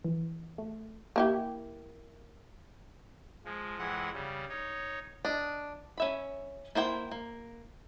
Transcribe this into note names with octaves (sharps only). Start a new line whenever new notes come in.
E3
A3
A#3 E4 G4
F3 G#3
F2 E3 G#3 F#5
C#3 G3
D#4 C#5
D4 D#5
C#4 E5 B5
A#3 E4 C5 G5
A#3